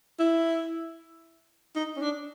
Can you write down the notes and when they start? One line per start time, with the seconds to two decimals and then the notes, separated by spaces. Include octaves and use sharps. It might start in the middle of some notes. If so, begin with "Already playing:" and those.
0.20 E4
1.76 D#4
1.97 C#4
2.02 D4